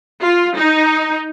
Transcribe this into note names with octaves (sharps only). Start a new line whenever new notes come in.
F4
D#4